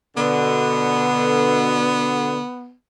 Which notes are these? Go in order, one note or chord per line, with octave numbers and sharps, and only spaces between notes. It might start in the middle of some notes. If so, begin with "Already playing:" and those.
B2 D3 B3